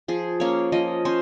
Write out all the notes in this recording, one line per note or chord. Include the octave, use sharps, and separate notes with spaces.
F3 G#4
A#3 C#4 C#5
F3 D#5
C#4 C5